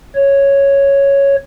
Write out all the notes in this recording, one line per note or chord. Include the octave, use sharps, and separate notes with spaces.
C#5